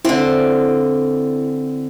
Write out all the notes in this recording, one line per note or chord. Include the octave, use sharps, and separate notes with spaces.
D3 C4 E4